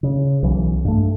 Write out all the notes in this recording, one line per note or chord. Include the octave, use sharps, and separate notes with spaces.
C#3
B1 E3
G2 A3